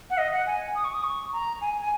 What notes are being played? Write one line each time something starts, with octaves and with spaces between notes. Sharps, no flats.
F#5
D#5
F#5
G#5
D#6
C#6
D#6
C#6
A#5
G#5
G#5